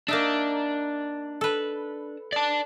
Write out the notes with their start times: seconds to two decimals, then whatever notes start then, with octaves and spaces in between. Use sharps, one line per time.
0.08 A#3 D4 D#4 E5
1.41 A4 B4
2.33 D5 A5